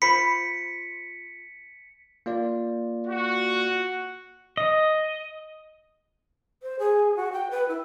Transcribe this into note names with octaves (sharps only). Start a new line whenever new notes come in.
F4 C5 B5 B6 C#7
A#3 F4 D5
F#4
D#5
C5
G#4
F#4
G5
B4
E4